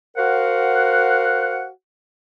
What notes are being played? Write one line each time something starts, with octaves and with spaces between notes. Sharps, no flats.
F#4 A#4 C5 F5 F#5